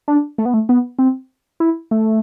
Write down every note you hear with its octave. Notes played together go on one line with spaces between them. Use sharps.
D4
A3
B3
A3
B3
C4
E4
A3